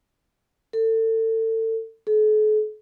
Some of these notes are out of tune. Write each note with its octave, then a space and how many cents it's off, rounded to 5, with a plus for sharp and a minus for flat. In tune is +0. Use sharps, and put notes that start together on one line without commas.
A4 +30
A4 -45